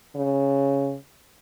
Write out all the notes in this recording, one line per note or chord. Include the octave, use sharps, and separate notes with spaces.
C#3